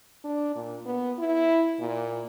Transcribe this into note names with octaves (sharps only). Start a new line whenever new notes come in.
D4
A#2
B3
E4
A#2